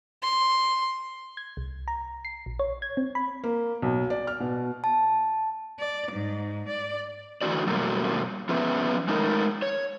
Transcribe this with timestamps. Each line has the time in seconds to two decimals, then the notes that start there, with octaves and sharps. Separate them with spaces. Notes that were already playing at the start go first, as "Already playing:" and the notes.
0.22 C6
1.37 G#6
1.57 C2
1.88 A#5
2.25 C7
2.46 A#1
2.59 C#5
2.82 G#6
2.97 C4
3.15 B5
3.44 A#3
3.82 B1
4.10 D5
4.27 F6
4.40 B2
4.84 A5
5.79 D5
6.12 G#2
6.68 D5
7.41 D3 E3 A3 C#4 F#4 D5
7.67 F#2 B2 F#3 G3 A3 A#3
8.49 F3 B3 C#4 G#4 B4 E5
9.08 G#3 A3 D#4 A4 A#4
9.62 C#5